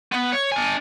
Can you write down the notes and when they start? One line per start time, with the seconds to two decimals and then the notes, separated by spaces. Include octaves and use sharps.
0.12 B3
0.32 C#5
0.52 D4 G#5